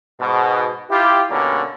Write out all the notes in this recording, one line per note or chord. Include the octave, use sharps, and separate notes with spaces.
G#2 B2
E4 F4 G4
B2 D3 G3 A#3 C#4